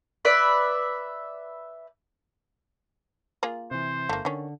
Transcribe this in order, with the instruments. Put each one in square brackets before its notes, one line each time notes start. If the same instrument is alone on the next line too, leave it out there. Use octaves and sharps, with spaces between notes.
[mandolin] B4 D5 E5
[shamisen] A#3 F4 G#4
[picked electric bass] C3 E3 [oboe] C5
[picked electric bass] G1 [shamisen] A3 A#3
[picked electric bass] D3 [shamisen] D#3 C#4